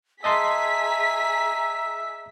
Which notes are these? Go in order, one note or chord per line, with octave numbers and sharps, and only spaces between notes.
G#4 D#5 E5 A5 A#5 C6 B6